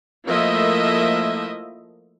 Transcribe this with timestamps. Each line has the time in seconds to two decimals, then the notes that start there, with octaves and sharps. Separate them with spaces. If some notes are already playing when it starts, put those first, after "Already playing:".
0.26 F3 A3 A#3 E4 D#5 E5